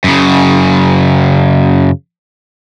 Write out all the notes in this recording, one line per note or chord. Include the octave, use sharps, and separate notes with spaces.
F#2 C#3